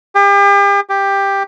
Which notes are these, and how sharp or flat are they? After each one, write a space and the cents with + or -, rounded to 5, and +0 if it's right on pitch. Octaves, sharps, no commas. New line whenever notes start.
G4 +40
G4 +10